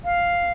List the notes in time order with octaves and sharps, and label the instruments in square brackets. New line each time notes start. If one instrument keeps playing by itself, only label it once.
[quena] F5